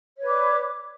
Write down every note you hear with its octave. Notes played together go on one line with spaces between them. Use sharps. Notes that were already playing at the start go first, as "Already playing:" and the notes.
B4 C#5 D5 D6